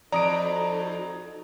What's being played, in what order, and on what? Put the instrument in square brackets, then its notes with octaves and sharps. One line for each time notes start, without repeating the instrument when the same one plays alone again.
[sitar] F2 [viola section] D#4 F#4 A4 [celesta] D5 [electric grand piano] A#5 D#6 D7